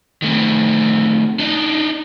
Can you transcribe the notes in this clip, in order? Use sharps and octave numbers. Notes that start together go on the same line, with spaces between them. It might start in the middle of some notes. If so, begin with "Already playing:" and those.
D#3 A3 C4
D4 D#4